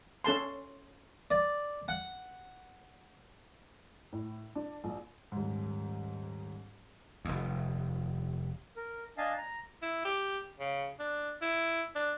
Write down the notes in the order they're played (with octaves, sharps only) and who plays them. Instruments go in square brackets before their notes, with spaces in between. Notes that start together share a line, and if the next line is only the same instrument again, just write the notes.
[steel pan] C#4 A4 A5 C6
[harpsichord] D5
F#5
[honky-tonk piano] A2
D4
A#1
[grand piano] D#1 G#2
[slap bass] F1 D#2
[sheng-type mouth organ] A#4
D4 D#5 F5 G#5 A5
A#5
[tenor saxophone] E4
G4
C#3
D4
E4
D4